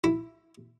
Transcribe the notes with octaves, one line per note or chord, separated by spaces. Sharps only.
E4